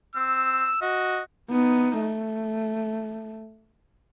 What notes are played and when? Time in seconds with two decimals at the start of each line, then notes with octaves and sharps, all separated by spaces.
0.16 C4 E6
0.82 F#4 D#5
1.50 B3 D#4
2.01 A3